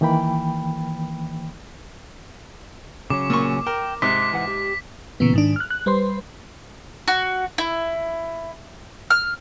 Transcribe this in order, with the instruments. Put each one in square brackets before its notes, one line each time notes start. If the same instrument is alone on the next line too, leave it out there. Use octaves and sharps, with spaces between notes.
[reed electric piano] D#3 E3 A#3 G5 B5
[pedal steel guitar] C#3 F#3 C#4 [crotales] D6
[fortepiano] A#2 C#6
[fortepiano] A#4 [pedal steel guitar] G5
[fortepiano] G#2 C3 [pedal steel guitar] C6 D6 F#6 [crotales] B6
[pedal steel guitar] E3 F#5
G4
[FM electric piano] A#2 C#3 E3 B3
G#2 D#3 D4
F6 F#6
F#6
G3 B4 C5 C6
[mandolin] F#4
E4
F6